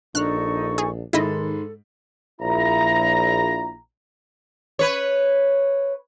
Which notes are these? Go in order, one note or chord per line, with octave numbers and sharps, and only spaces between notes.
A#1 D4 D#4 A4 C#6 F6 F#6
G#4
G#2 D#3 G#3 E4 A4 D#5 E5 B5
A#1 E4 A#5
B4 C#5